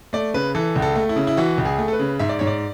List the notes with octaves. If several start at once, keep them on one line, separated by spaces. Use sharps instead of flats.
A3 D5
C#3 B4
E3 A4
C#2
A4
A3
E4
C#3
E4
E3 F#4
C#2
G#4
A3
A4
B4
C#3
G#2 E5
D5
G#2 C#5
D5